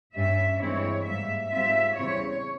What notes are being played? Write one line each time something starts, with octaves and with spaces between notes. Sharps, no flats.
G2 G3 C#4 E5
G2 E3 G#3 C4 E4 C#5
G#2 G3 A#3 E5
G#2 G3 C4 F4 E5
E2 C#3 G3 C4 E4 C#5